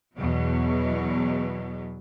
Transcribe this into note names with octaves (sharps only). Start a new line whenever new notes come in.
E2 B2 F#3